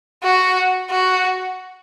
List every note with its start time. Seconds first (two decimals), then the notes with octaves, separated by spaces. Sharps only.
0.23 F#4
0.90 F#4